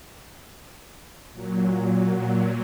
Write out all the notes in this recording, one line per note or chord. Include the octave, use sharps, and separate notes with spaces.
A#2 F#3